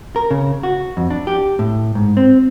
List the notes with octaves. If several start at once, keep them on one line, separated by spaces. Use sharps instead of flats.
A#4
C#3
F#4
F2
D4
G4
A2
G#2
C4